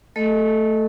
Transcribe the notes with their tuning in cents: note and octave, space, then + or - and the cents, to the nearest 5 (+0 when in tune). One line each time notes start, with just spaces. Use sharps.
A3 +0 A4 +0 D#5 +0